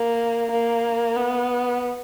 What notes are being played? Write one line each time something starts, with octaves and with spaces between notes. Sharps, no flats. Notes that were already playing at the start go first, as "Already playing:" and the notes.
Already playing: A#3
A#3
B3